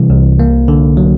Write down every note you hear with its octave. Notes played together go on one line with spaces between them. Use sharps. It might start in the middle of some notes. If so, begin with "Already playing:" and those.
Already playing: C3 E3 G3
C2
A#3
D3
F#3